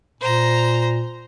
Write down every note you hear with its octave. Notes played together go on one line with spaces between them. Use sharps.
A#2 C5 A#5